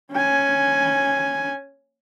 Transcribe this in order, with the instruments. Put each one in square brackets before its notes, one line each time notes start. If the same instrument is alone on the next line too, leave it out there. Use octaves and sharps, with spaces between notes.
[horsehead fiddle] C#4 G#5